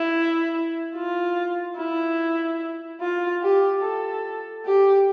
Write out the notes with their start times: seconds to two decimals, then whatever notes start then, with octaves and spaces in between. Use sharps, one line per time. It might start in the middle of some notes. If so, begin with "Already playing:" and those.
Already playing: E4
0.95 F4
1.77 E4
3.01 F4
3.42 G4
3.83 A4
4.65 G4